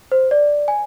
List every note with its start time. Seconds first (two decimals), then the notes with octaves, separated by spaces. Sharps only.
0.12 C5
0.31 D5
0.68 G#5